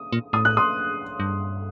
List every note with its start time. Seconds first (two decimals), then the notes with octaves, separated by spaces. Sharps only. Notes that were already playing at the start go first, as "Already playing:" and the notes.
Already playing: D#6
0.12 A#2
0.33 A2 D#6
0.45 F#6
0.57 C6 D#6
1.20 G2